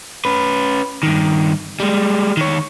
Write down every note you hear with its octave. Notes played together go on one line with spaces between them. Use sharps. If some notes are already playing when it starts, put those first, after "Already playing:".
C#4 B4
G2 D#3
G3 G#3
D#3 C#5